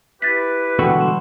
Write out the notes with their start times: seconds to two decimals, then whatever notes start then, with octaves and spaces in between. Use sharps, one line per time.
0.22 E4 G4 B4 A6 B6
0.79 B2 D3 E3 G#3 B3 F#4 F#5 G5
1.00 G3 C6 E7